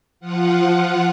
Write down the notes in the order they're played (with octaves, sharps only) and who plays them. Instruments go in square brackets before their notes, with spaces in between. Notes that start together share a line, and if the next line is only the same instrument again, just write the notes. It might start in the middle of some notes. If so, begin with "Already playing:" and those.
[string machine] F3 F4 F#5